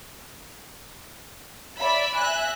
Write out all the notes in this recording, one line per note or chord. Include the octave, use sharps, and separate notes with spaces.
D5 E5 B5
E5 G#5 F#6 A#6